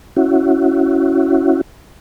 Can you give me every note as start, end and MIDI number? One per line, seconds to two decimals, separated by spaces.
0.17 1.61 61
0.17 1.61 64
0.17 1.61 66